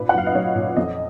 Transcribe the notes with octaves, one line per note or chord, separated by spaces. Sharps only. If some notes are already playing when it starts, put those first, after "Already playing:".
Already playing: A#2 B4
F#5
F#3 F5
D#5
F#3 C#5
A#2
F2 D#5